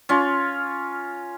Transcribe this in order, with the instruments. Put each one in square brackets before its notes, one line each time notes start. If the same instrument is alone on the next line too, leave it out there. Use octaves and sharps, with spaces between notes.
[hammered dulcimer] C#4 F4